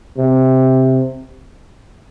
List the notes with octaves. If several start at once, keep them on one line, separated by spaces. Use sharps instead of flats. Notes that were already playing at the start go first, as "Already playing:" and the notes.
C3